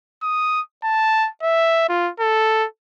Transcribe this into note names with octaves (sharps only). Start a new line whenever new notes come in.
D#6
A5
E5
F4
A4